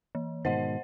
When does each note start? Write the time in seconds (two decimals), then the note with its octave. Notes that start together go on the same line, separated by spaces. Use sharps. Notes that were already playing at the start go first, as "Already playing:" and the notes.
0.15 E3
0.45 G#2 B2 D#3 C5 D#5 F#5